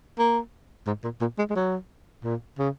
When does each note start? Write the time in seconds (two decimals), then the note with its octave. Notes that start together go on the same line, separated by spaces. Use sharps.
0.19 A#3
0.87 G#2
1.04 A#2
1.21 A#2
1.38 G#3
1.50 G#3
1.56 F#3
2.24 A#2
2.59 C#3